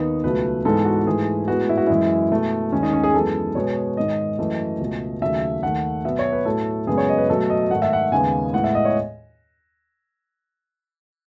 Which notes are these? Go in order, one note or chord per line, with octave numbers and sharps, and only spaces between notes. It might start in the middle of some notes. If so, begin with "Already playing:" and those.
Already playing: D#2 D#3 B3 D#4
C#2 B2 F#3 A3 B4
G#2 E3 G#3 B3 A4
F#4
G#2 E3 A3 G#4
A2 G#3 B3 F#4
E4
F#4
F#2 E3 G#3 E4
B2 A3
D#2 D#3 G#3 C#4
D#4
C#4
G#4
F#2 E3 G#3 B3 A4
B2 G#3 B3 C#5
G#2 D#3 G#3 D#5
F#2 E3 A3
C#2 B2 A3
D#2 C#3 F#3 A3 E5
D#2 D#3 A3 F#5
B2 F#3 B3 E5
C#5
B4
A2 F#3 A3 A4
F#2 C#3 G#3 B3 G#4
C#5
D#5
B4
B2 F#3 A3 A4
D#5
G#2 D#3 A3 F#5
E5
F#5
D#2 C#3 G#3 B3 G#5
A2 G#3 B3 F#5
E5
D#5
C#5